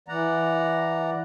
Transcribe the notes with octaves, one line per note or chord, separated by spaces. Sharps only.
E3 D5 F#5 A#5